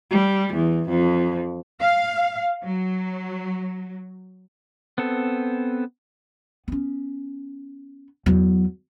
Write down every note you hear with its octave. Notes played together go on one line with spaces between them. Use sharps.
G3
E2
F2
F5
F#3
B3 C4 A4
B3 C#4
E2 F#3